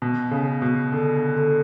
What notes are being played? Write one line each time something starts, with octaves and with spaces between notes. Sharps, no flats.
B2
C#3
B2
D3
D3